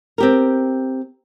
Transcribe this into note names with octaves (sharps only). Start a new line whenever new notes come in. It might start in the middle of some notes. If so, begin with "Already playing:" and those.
C4 G4 A#4